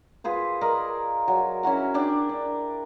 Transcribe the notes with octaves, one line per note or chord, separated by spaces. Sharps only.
F4 G#4 B4 C5
A#4 D5 D#5
F#3
C#4 E4 F#4 A#4
D4 D5 G5
D4